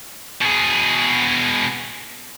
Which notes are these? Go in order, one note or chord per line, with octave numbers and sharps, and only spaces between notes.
B2 G#4